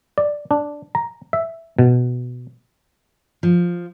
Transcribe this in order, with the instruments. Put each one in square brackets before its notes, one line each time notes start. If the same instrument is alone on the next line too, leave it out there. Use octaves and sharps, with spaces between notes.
[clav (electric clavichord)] D5
D4
A#5
E5
B2
[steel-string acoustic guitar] F3